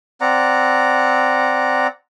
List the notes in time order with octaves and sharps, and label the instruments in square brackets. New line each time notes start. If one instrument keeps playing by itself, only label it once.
[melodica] C4 D5 F#5 A#5